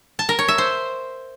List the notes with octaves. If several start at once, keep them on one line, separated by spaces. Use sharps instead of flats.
A5
A#4
C#5
E5
C5